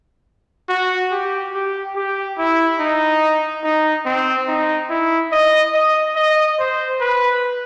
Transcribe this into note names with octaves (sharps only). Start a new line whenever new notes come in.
F#4
G4
G4
G4
E4
D#4
D#4
C4
D#4
E4
D#5
D#5
D#5
C5
B4